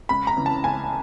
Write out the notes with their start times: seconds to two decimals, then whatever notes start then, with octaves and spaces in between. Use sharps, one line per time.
0.09 C#2 B5
0.27 A#5
0.37 C#3 E3
0.46 A5
0.64 C#2 G#5